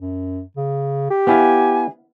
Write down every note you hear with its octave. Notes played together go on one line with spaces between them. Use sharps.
F#2
C#3
G4
B3 E4 F5 G#5